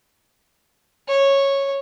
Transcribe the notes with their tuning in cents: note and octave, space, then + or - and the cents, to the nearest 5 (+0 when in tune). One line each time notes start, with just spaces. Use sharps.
C#5 -10